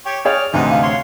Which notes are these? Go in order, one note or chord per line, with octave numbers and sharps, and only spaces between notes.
G4 C#5 C#6
G#4 C#5 D5 G5 F6
A1 D2 C3 G#3 B3 D#4
F5
C#5 C6